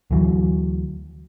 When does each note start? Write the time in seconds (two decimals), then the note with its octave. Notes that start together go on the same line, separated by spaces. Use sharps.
0.11 D2 E3 F#3